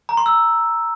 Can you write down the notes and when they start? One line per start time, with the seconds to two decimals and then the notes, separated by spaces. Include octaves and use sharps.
0.09 A#5
0.17 C6
0.26 E6